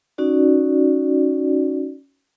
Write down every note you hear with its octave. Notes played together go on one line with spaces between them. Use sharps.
C#4 D#4 F#4 D5